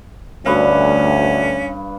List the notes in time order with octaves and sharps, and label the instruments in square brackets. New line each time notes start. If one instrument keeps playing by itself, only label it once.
[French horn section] D2 [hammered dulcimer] G2 B4 F5 [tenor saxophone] C#4